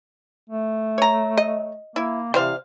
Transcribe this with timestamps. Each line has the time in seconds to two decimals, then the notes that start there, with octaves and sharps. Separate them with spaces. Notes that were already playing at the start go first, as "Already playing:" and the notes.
0.50 A3
0.98 C#5 A#5
1.37 D#5
1.96 A#3 E4
2.34 C3 E3 G3 C5 F5